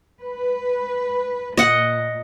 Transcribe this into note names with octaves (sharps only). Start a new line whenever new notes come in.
B4
A#2 D#5 F#5